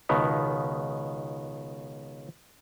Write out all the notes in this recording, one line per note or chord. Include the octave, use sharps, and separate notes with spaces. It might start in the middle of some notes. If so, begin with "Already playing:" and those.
C#2 B2 D#3 B3